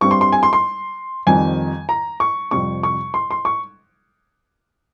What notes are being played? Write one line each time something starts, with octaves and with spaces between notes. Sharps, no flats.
G2 G3 C4 C#6
C6
C6
G#5
C6
C6
F2 D#3 G3 C4 G#5
A#5
C#6
F2 C3 G3 C4 C#6
C#6
C6
C6
C#6